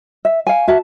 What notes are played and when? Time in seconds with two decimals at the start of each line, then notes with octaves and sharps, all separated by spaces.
0.25 E5
0.47 F5 G#5
0.67 F#4 E5 A5